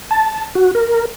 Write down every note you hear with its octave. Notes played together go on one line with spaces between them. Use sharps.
A5
F#4
A#4